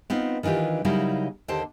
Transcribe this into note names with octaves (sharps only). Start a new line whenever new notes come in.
B3 C4 D#4 F4
D#3 E3 D4 F4 G4
C#3 F#3 G3 A#3 D#4 E4
D#2 D3 G4 C5 A5